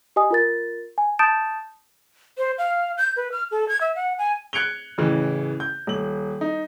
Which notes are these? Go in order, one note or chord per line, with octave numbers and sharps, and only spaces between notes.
G4 D#5 G#5 D#6
F4 A#4 A6
G#5
A5 D#6 G6 A6 D7 E7
C5
F5
G6
B4
F6
A4
G#6
E5
F#5
G#5
F#6 G#6 C#7 D7 F7 G7
A1 C#3 E3
G6
D#1 F#7
D#4